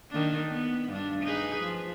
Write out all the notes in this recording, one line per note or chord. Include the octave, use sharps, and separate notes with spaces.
D#3 A#3 D4
B3
G2 D4
D#4 G#4 B4
F3